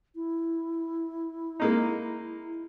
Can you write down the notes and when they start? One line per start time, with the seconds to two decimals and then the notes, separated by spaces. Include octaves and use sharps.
0.15 E4
1.60 G#3 A#3 D#4